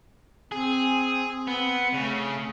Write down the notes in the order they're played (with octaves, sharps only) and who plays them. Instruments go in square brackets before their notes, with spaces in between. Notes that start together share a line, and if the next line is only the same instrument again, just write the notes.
[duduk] C4 [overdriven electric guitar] G#4
[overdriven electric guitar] B3 [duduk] C4
[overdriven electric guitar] C#3 [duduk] A3